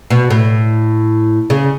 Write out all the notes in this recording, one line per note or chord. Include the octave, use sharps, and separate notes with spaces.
B2
A2
C#3